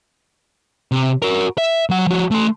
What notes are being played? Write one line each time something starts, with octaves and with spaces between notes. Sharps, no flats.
C3
F#4 A#4
E5
F#3 F#5
F3 F#4
A3 C6